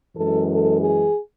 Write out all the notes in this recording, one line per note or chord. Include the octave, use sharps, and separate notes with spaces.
F#2 E3 G#3 A4
A4
G#4